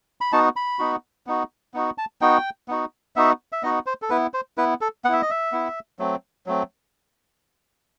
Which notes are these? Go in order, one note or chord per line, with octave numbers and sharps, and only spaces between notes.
B5
B3 D#4 F#4 A5
B5
B3 D#4 F#4
B3 D#4 F#4
B3 D#4 F#4
A5
B3 D#4 F#4 G5
B3 D#4 F#4
B3 D#4 F#4 E5
E5
B3 D#4 F#4 D#5
C5
A4
B3 E4 B4
C5
B3 E4 B4
A4
B3 E4 E5 F#5
D#5
E5
B3 E4
F#3 A3 C4
F#3 A3 C4